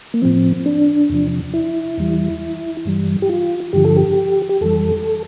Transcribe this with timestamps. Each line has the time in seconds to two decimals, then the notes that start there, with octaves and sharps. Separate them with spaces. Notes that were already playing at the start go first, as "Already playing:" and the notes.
0.14 A#3
0.22 A2 F3 C4
0.66 D4
1.10 E2 C3 F3
1.54 E4
1.98 E2 E3 G3
2.85 G2 E3 G3
3.22 G4
3.29 F4
3.73 G2 D3 F3 G4
3.85 A4
3.96 G4
4.49 G4
4.61 F2 E3 G3 A4